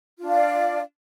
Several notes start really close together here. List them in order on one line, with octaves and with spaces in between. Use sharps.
F4 D4 F5 D5